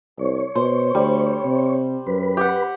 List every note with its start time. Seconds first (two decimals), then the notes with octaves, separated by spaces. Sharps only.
0.19 C2 C#5
0.55 B2 C5
0.95 D2 G3
1.45 C3
2.07 F#2 B4
2.37 G4 F#5